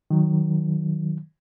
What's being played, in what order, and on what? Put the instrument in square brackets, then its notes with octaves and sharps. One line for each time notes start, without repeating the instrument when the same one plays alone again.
[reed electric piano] D#3 F#3